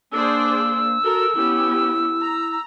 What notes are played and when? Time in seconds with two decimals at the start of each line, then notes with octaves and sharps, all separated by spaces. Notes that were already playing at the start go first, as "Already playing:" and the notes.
0.12 A#3 D4 G#4 C5 E6
1.04 F#4 A4 A#4
1.35 B3 C#4 E4 G4
2.21 A#5